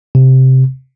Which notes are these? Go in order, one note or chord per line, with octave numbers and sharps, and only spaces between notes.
C3